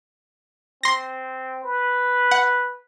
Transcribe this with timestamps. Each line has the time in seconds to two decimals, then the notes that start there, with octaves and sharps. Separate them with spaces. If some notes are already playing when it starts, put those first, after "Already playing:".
0.83 C4 C6 A#6
1.64 B4
2.31 F#5